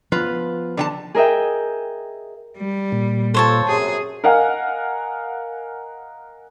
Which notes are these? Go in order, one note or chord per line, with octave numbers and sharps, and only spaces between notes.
F3 B3 F4 B4
D3 G#5 A5
G#4 A#4 D#5 E5 G5
G3
A#2
F4 A4 C5 C#5 A5
F#2 C3 F#3 G#4
A#4 D#5 F5 F#5 G#5